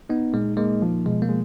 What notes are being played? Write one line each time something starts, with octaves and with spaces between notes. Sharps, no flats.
B3 D#4
A#2 G#3
G#3 A#3
F3
B2 G#3
A#3
G#3